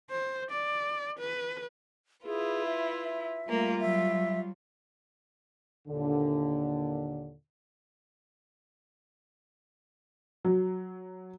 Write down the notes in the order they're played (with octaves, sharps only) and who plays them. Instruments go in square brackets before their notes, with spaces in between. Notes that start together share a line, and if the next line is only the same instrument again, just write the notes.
[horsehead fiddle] C5
D5
B4
[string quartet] E4 F4 B4 [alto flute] G#4
[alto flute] E5
[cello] G3 F4 [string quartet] A3 A#3 A#4
[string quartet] F#3 [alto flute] E5
[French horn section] D#2 A#2 D3
[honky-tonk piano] F#3